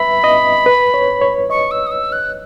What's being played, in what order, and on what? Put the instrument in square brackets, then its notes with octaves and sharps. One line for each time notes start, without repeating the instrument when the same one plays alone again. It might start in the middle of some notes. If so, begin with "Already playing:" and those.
Already playing: [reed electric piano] B4 E5 [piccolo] B5
[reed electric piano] D#5
B4
C#5
C#5
[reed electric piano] D#5 [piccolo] C#6
[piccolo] E6
D#6
E6
F#6